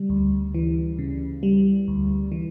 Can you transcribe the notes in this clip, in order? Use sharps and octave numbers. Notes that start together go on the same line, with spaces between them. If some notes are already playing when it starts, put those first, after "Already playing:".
Already playing: C#3 G3
D2
E3
C#3
G3
D2
E3